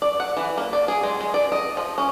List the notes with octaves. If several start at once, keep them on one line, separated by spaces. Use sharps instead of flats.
D5
F#5
E3
A#3
D5
G#4
G#3
G#3
D5
D#5
F3
C#4